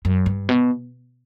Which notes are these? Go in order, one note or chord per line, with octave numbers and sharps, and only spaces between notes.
F#2
G2
B2